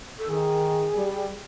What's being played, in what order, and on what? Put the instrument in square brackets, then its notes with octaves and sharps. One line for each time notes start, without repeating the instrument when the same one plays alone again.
[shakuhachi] A4
[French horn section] D#3 [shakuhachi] G#4
[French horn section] G3